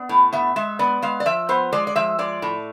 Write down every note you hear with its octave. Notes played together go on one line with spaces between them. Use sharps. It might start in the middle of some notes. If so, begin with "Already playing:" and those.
Already playing: B3 D5
A2
B3 E5
G#3 E5
B3 D5
G#3 F5
D5
F3 E5
B3 C5
G#3 D5
D5
F3 E5
G#3 D5
A2